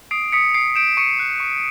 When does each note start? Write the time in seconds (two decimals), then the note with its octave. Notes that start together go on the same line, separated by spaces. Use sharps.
0.11 D#6 C7 D7
0.32 D#6 B6 C#7
0.54 D#6 C7 D7
0.75 G6 D7 E7
0.97 C#6 C#7 D#7
1.19 F#6
1.40 C#6